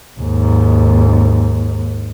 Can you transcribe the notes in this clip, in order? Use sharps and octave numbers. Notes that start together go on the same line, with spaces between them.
D#2 G#2